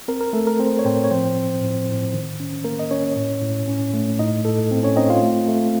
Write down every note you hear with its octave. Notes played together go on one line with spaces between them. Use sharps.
C4 A#4
A#4
A3 A4
A#4
C4 C5
C#5
A2 C4 C5
C#5
F3 C4 C5
C4
A2
A2
D#3
C#4
A#3 A#4
D#5
C#4 C#5
A2
A2
C#4
A3
A2 D#4 D#5
A2 A4
C4
C#4 C#5
C4 D#4 D#5
F4 F5
A3
A3